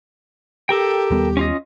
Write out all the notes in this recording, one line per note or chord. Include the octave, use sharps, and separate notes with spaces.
G4 A4 A#4 G5
D#2 G3 B3
C#4 F4 D#5